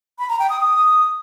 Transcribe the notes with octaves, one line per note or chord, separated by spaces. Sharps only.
B5
A#5
G5
D#6
D#6